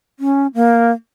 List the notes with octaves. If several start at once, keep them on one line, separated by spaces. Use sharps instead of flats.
C#4
A#3